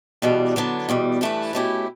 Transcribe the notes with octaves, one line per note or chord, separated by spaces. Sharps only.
E2 B2 G3 D4
D3 F#3 B3 D4
E2 B2 G3
G2 E3 A3 E4 B4
B2 A3 C#4 E4 G4